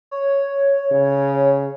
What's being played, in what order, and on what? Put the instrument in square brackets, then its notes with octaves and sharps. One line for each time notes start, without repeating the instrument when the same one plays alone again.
[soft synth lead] C#5
[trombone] C#3